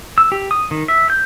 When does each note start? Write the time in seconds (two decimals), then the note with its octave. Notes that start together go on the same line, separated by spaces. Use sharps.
0.18 E6
0.32 G4
0.51 D#6
0.71 D#3
0.88 E5
1.10 G6